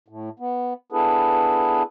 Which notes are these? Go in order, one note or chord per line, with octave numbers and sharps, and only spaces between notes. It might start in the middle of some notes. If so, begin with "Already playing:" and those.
A2
B3
B3 D4 E4 G#4 A4 B4